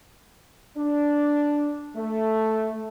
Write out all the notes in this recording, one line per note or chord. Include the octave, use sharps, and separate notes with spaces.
D4
A3